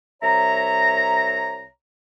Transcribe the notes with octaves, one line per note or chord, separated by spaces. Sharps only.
C2 C#5 E5 A#5